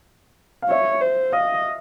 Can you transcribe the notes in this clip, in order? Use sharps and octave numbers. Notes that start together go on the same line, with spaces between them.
F5
C#5 E5
C5
D#5 F5